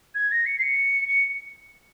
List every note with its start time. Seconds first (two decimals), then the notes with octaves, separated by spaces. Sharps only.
0.15 G#6
0.31 A#6
0.46 C#7
0.58 C7
0.62 C#7
1.08 C#7